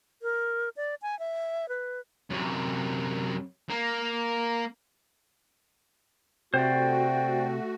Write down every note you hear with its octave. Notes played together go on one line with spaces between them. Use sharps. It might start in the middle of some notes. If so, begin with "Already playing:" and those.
A#4
D5
G#5
E5
B4
F#2 C3
A#3
C3 A3 F#4 C5 D5 G5